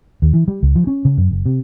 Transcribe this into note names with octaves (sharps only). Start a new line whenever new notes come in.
D#2
E3
G3
C#2
F3
C#4
C#3
F#2
F#1
C3